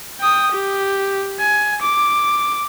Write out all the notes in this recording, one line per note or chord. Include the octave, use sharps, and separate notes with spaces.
G5 D#6
G4
G#5
D6